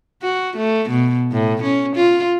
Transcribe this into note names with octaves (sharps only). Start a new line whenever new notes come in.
F#4
A3
B2
A2
C#4
F4